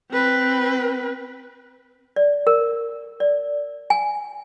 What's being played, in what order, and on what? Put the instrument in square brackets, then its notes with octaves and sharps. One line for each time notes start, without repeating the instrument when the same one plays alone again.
[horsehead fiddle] C4 B4
[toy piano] D5
A#4
D5
G#5